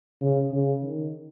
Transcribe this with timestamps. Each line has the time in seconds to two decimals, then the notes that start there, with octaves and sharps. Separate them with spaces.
0.22 C#3
0.52 C#3
0.82 D#3